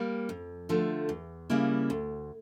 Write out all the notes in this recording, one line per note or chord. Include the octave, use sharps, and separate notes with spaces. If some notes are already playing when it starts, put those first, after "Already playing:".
Already playing: G3 A#3
F2
D3 F3 A3
E2
C#3 G3 A#3 E4
D2